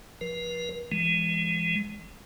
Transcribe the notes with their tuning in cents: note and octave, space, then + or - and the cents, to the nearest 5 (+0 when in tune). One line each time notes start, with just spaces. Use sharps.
F3 +0 B4 -45
E3 +45 G#3 +0